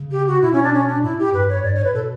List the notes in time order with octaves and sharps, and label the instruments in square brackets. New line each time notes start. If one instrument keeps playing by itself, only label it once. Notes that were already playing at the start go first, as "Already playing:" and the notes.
Already playing: [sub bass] C#3
[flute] G4
F#4
[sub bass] B2 [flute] E4
[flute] C#4
D4
C#4
D4
[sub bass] A2 [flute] E4
[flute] G4
[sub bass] G2 [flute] B4
[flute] C#5
[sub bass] G2 [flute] D5
[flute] C#5
[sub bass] A2 [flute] B4
[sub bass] B2 [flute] A4